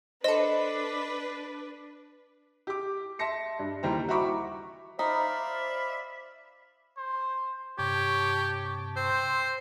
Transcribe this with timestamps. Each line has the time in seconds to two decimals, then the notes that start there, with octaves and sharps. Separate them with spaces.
0.24 D4 A4 B4 C5 D#5
2.67 G4 D6
3.19 E5 A5 C6 A#6 C#7
3.59 G2
3.83 D#2 E3 G3 C5 A#5
4.09 F#4 E5 A#5 B5 C#6 D6
4.99 D#4 C5 D5 E5 F5 B5
6.97 C5
7.78 G2 C3 G4 C#5 A5
8.96 C4 C5